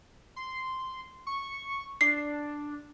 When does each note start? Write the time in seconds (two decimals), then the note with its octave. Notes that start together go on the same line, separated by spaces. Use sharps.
0.36 C6
1.27 C#6
2.01 D4 C7